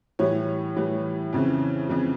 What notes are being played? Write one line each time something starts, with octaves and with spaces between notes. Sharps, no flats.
A2 E3 G3 C#5
A2 E3 G3
F2 C#3 E3
F2 C#3 E3